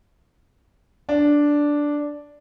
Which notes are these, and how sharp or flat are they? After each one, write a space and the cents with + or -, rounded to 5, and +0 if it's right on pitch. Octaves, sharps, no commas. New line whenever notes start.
D4 -5